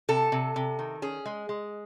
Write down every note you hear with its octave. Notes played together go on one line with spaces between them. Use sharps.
C3 A4
C3
C3
D#3
C#4 G#4
G#3
G#3